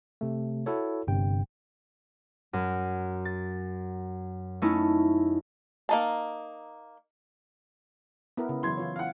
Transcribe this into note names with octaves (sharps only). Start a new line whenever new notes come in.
C3 A3
E4 F#4 A4 C#5
G1 G2 C3 G5
F#2
A6
A3 C#4 D#4 E4
A#3 D#4 A5
B3 E4 A#4
C#3
E3 F#3 E4 C6 G#6
E3 F4 C#5
F5 F#5